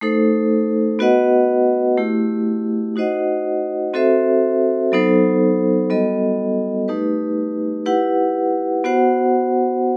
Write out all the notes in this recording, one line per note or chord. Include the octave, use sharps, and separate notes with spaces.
A3 D#4 A4 C5
B3 F#4 B4 D#5 F#5
A3 E4 G4
D#4 F#4 C5 D#5 F#5
C4 F#4 A4 C5 E5
F#3 B3 D#4 A4 C5
G3 B3 F#4 A4 D#5
A3 D#4 G4 B4
E4 G4 B4 F#5
B3 F#4 C5 F#5